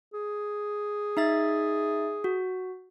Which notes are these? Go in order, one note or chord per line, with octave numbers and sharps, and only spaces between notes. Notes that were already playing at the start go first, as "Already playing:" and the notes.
G#4
D#4 E5 A6
F#4